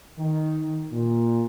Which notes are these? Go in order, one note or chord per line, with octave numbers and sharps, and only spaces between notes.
D#3
A#2